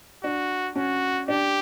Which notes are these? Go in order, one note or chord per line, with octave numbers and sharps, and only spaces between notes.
D4 F#4
C#4 F#4
D4 G4